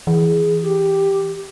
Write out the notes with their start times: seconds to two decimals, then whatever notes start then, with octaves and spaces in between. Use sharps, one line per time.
0.07 E3 G#4
0.62 G4